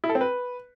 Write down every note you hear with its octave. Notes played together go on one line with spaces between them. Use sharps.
E4
A4
C4
B4